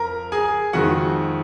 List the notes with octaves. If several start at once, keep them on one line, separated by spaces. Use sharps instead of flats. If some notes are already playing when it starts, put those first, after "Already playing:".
Already playing: F2 A#4 A#5
G#4 G#5
F2 D#3 G#3 F#4 F#5